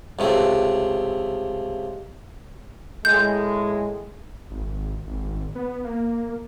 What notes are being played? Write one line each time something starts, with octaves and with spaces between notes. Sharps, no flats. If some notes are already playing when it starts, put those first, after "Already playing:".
C#2 C3 A3
A2 G#3 G6
G#1
G#1
B3
A#3